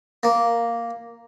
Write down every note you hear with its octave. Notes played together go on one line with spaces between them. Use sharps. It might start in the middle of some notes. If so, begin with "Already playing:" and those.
A#3